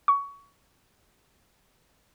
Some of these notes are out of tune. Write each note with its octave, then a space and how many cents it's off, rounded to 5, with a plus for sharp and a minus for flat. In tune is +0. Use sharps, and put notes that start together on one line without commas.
C#6 +20